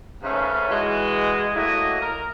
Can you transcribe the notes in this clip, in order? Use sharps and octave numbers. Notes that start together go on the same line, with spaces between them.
G#2 C#3 A3 C#4 B4 F5
E3 G#3 F#4
F#3 A3 A#3 E4 F#4 D#5
A#4